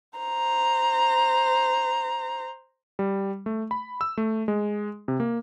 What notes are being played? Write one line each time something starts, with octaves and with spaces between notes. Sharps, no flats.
C5 A#5
G3
A3
B5
E6
A3
G#3
C3
A#3